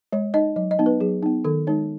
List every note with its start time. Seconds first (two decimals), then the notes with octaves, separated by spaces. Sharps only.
0.13 G#3 C#5
0.34 D#4 D#5
0.56 F#3 D#5
0.71 D#5
0.79 B3 D#4
0.86 B4
1.01 F#3 G#4
1.23 B3 D#4
1.45 D#3 A4
1.67 G#3 D#4 C#5